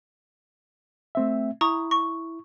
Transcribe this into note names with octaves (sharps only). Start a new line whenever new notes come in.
A3 C4 E5
E4 A#5 C#6 D#6
C#6